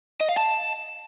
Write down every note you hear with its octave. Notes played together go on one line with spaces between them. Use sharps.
D#5
F5
A5